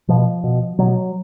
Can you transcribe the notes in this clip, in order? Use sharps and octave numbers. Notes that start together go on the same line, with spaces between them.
B2 F3
B2
B2 F#3